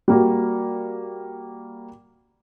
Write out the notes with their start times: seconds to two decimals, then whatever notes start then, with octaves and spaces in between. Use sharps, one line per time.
0.08 G3 A#3 F#4